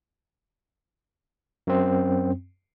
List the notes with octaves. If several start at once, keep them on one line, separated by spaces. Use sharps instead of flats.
F#2 C4